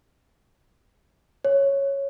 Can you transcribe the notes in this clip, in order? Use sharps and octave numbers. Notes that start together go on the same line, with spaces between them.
C#5